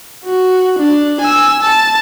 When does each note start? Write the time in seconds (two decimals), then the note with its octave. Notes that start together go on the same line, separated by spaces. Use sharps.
0.25 F#4
0.79 D4
1.21 G#5 E6
1.62 A5